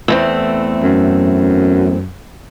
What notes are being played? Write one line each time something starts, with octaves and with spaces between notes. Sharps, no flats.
E2 A3 C4
F#2